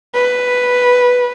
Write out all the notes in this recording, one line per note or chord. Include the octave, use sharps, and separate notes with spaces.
B4